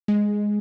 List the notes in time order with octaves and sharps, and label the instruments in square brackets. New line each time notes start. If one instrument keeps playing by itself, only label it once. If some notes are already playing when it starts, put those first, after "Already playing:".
[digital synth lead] G#3